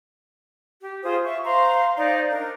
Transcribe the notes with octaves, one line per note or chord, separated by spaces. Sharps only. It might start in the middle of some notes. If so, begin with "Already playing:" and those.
G4
F4 G#4 C5 D#6
E5 C#6
C5 F5 A#5 C6
D#4 C5 D5 F5
D4 A#4